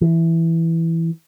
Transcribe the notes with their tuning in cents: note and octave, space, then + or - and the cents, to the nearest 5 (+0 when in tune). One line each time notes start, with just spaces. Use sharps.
E3 +0